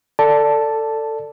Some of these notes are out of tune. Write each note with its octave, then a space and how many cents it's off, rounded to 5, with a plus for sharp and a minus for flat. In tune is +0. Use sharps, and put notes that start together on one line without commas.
A4 +20 D5 +0 A5 +0